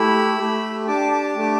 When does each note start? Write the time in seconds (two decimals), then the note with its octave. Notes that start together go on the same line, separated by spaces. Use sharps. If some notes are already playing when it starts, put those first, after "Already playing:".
Already playing: A3 E4 G4 B5 E6
0.38 A3 G4
0.87 D4 G4 A5 D6
1.11 A5 D6
1.36 A3 D4 G4